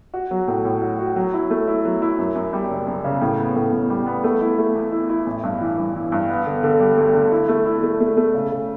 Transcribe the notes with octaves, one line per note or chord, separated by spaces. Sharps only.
F#4
F#3
A2
A2
F#4
F#4
F#3
E4
A3
E4
F#3
E4
F#2
F#2
G3
F#1
F#2
C#3
A2
B3
A2
A2
G3
B3
A3
E4
A3
E2
E4
E4
A1
G2
E3
G2
E3
G2
B3
D3
D3
G3
D2
D3
E4
A3
E4
A3
A3
A3
C#3
C#3